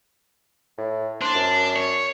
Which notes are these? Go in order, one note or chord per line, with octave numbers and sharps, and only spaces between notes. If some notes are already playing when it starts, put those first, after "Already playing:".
A2
D4 C5
F#2
C#5